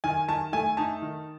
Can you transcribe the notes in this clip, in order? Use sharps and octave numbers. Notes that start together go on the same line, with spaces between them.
D#3 G#5
D#3 A5
A3 G#5
D#4 A5
D#3